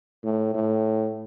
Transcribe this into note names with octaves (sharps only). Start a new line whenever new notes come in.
A2
A2